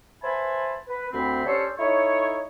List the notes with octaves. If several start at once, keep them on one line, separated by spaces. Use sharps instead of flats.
B4 C5 E5 G#5 A5 B5
B4
D2 C4 B5
C#4 D4 G4 A4 C5 C#5
D#4 E4 A4 C#5